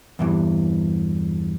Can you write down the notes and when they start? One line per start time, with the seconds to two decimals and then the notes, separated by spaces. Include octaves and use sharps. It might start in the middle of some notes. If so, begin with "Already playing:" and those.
0.19 E2 G2 E3